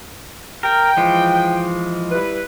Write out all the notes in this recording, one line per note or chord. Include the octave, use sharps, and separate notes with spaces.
A#4 G5
E3 F3 G#3
G3 E4 B4